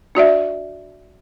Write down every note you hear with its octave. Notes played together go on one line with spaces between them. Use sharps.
D4 F#4 D5 E5